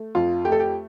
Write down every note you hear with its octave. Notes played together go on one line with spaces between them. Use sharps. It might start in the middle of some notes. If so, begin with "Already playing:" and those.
Already playing: A3
F2 F4
A3 G4
A4
G4